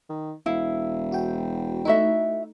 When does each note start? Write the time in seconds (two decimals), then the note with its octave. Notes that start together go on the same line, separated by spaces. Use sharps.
0.10 D#3
0.46 E1 E4 F5
1.12 F#4 G5
1.85 A3 D#4 E4 F#4 E5